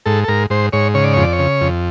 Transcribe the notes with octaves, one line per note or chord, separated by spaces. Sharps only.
G#2 A4
A4
G#2 A#4
G#2 C5
G#2 C#5
C#3 C#5
D5
F2 C#5
D5
C#5
C#3
F2